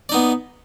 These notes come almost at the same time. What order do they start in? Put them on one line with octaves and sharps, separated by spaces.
D5 D#4 B3